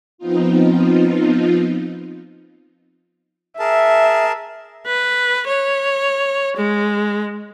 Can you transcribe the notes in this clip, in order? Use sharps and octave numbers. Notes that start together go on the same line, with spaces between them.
F3 B3 C4 D#4 F4
G#4 A#4 E5 A5
B4
C#5
G#3